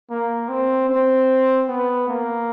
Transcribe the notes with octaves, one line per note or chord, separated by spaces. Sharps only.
A#3
C4
C4
B3
A#3